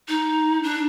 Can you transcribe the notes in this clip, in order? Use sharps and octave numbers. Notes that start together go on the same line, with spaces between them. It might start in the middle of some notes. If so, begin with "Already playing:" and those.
D#4
D4